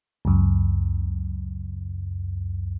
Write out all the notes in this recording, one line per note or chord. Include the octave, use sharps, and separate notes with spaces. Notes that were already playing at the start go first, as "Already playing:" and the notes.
C#2 F#2